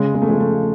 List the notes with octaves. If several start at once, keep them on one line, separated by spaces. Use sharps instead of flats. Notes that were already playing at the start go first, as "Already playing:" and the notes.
Already playing: C#3 G#3
G#3
A3
F3 G#3
A3